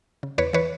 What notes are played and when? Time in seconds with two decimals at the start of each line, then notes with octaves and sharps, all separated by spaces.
0.23 C#3
0.38 E2 B4 C#5
0.53 E3 B4 C#5